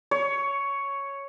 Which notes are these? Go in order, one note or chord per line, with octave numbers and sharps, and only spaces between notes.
C#5